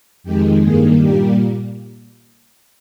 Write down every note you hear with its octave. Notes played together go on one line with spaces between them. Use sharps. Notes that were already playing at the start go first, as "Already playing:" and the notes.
F2 D#3 G#3 G4
G2 D#3 A#3 G#4
A#2 G3 A#3 G4